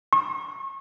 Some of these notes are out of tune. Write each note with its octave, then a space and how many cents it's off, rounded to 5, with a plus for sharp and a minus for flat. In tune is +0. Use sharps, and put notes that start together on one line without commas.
C#6 -40